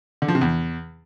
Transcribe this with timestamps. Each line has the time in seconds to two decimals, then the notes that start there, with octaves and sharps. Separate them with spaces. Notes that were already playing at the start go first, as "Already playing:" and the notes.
0.22 D3
0.28 F3
0.35 C3
0.41 E2